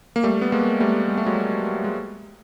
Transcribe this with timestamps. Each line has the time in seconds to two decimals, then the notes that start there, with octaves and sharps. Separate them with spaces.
0.16 A#3
0.23 G3 A3
0.41 B3
0.52 G#3 A#3
0.80 G3 A3
1.09 G#3
1.18 A3
1.26 F#3 G#3
1.84 G#3